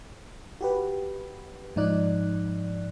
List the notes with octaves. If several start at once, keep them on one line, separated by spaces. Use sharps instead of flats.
F#4 G4 B4
G#2 F3 D#4 D5 F#6